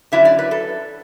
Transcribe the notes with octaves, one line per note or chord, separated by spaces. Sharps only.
D3 F#3 C#4 E4 E5
D5
B4
A4